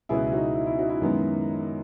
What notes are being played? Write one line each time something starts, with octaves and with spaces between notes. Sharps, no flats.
C#2 B2 F#3 B3 E4 G#4
G#4
D#4 F#4
E4
E4
D#4 F#4
E4
F#2 D#3 G#3 B3